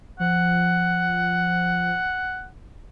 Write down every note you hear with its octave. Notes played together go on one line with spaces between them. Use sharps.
F3 F#5